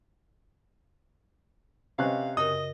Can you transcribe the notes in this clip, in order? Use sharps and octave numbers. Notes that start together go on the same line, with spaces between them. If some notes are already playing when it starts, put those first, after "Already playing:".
C3 C#4 B4 D#5 F5 F#6
F#2 C#3 A#4 D#5 D#6